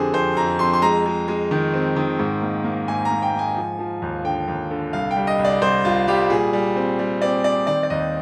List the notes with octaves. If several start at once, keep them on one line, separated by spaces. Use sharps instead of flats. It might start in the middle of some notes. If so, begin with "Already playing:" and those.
Already playing: F2 D3 C4 G4 G#4 C5
F2 C5
F2 A#5
F2 C6
C6
G#3 A#5
G#3
G#3
D#3
C4
D#3
G#2
A#3
A#3
G#2 G#5
A#5
A#3
G5
G#2
G#5
F3
F3
D#2
D3 G5
D#2
D3
C2 F5
G5
G3
D#5
C2
D5
C2 C5
C2 F4
G3 G4
A#2 G#4
G3
C4
G3
C4 D5
C4 D5
D#3 D5
D5
D#2 D#5